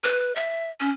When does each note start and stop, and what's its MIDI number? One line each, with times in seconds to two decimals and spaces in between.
0.04 0.34 71
0.36 0.70 76
0.80 0.90 61